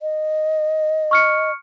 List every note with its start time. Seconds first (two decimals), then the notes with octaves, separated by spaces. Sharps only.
0.02 D#5
1.11 C#6 F6 C#7